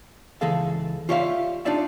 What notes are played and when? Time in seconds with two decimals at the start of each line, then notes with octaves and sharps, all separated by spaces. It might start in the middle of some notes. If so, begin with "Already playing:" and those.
0.41 C#2 E3 G#4 A4 F5
1.09 F4 G4 C#5 D5 E5 F5
1.65 D4 D#4 F4 D5 E5